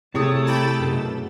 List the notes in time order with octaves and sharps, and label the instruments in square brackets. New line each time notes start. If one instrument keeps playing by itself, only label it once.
[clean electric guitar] C3 [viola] A3 A5 [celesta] E4 G#4 D#6 [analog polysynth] C#5
[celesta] E4 G#4 [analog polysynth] G5 B5 A6
[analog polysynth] F#2 B2